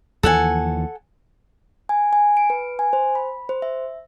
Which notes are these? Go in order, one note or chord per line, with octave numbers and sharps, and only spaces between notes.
D#2 E3 F3 A4 F#5 G#5
G#5
G#5
D7
B4
G#5
C5
B5
C5
E5